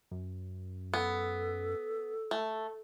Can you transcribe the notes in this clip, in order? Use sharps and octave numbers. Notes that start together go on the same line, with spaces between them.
F#2
B3 A4
A3